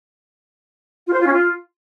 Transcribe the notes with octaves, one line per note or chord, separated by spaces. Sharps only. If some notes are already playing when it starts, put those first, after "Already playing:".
F4
C5
F4
C#4
F4